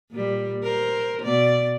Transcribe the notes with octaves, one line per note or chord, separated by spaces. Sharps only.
A#2 G3
A#4 C5
B2 D5